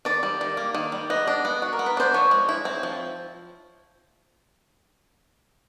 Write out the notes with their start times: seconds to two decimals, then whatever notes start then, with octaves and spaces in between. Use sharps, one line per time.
0.05 D#3 D5
0.23 G3
0.41 D#3
0.57 A#3
0.75 D#3
0.92 G3
1.10 B3 D#5
1.27 D4
1.45 B3
1.62 F#4
1.73 A#4
1.79 B3
1.86 B4
1.97 D4 C5
2.14 F3 C#5
2.31 G#3
2.49 E4
2.65 C4
2.83 F3